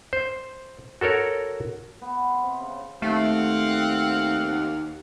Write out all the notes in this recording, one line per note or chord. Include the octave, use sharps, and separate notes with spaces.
C5
F#4 A4 A#4 C#5
B3
C6
C3
C#3
D#2 A3 C4 F5 F#5